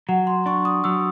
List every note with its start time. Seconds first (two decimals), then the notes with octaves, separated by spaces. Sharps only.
0.09 F#3 F#5
0.27 C6
0.46 D4 C#6
0.65 D#6
0.84 F#3 E6